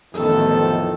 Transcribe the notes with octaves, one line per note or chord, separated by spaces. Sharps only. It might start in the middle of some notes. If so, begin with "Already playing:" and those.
A1 F2 D#3 B3 A4